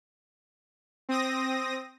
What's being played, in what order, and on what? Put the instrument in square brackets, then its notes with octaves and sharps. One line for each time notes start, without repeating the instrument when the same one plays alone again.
[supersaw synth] C4 D#6 A#6